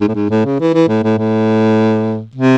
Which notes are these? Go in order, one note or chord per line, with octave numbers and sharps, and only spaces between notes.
G#2
A2
G#2
A2
C#3
E3
E3
A2
A2
A2
C3